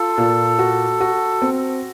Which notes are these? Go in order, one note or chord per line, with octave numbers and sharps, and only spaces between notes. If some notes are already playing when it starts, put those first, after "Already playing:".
Already playing: F4 A4
A#2
F#4
F#4
C4